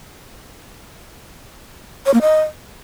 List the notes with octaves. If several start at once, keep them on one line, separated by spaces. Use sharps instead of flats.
C#5
A#3
D#5